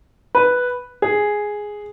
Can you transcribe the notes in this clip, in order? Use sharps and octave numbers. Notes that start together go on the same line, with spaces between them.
B4
G#4